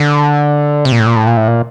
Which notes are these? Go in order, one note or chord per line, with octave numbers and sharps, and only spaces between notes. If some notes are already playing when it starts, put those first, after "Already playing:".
Already playing: D3
C3
A#2
A2
A#2
A2
A#2
A2
A#2